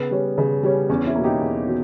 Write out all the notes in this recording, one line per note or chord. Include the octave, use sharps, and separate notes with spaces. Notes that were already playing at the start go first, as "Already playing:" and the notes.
Already playing: C#3 B3
G3 C#4
C#3
G3 C#4
E2 C#4
C#4 E4
B2 A#3
D#4 G4
E2
B2